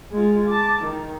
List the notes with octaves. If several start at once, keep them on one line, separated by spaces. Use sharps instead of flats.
G#3 F4
A5 D6
D#3